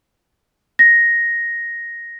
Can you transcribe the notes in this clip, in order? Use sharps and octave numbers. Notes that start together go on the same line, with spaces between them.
A#6